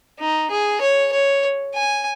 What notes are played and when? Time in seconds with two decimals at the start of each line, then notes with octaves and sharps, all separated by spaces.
0.19 D#4
0.50 G#4
0.81 C#5
1.12 C#5
1.74 G#5